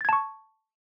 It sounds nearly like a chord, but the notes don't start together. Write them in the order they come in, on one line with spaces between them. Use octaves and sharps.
A6 G#6 A5 C#6